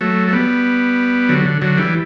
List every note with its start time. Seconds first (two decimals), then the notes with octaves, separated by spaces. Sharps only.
0.01 F#3 A3
0.28 A3
0.33 G3 B3
1.29 D3 F#3
1.45 D3
1.62 D3 F#3
1.77 E3 G3